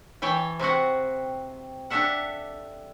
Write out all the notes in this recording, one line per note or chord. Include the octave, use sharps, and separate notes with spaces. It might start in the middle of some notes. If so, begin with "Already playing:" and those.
E3 C#5 G5 A5
C3 C4 F#4 F#5
D4 G4 A4 E5 F#5